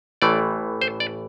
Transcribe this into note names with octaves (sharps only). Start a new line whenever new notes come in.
A1 A2 E3 A3 D5
C5
D5